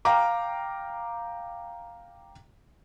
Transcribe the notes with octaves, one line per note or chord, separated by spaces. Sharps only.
F5 G5 A#5 D6